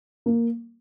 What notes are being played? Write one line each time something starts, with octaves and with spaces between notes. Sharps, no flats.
A#3